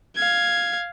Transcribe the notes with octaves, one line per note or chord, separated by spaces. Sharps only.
F5 G#6